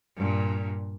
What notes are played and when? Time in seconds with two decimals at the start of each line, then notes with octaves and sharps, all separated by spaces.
0.17 G2 A#2